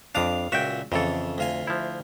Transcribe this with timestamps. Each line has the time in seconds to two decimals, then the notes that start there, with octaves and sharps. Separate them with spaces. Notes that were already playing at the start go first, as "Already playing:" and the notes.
0.15 F2 D4 F5 D6 D#6
0.52 C#2 A#2 F#4 E5 G5
0.92 F2 C#3 E3 A4
1.38 D2 F4 G#5
1.67 F3 E4